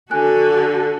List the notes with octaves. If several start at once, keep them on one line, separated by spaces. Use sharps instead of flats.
D3 F#4 A4 G#5 F#6